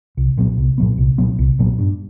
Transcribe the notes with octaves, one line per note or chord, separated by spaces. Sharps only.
C2
A#2 F#3 B3
C2
A#2 F#3 B3
C2
A#2 F#3 B3
C2
A#2 F#3 B3
G2